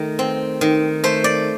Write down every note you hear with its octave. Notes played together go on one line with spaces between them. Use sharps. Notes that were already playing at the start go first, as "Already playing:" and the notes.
Already playing: D#3 A3
C4
D#3
A3 C5
D5